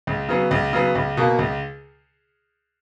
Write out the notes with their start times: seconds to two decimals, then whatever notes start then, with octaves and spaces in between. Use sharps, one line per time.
0.07 C#2
0.29 C#3 F#3 B3
0.51 C#2
0.73 C#3 F#3 B3
0.95 C#2
1.17 B2 A#3
1.39 C#2